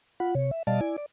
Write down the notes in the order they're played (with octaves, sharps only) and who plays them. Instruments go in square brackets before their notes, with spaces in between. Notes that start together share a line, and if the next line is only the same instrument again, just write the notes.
[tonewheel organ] F4 F#5 B5
C3 C#5
E5
B2 G3 D5 D#5 F5 A5
E4 D5 G#5
D5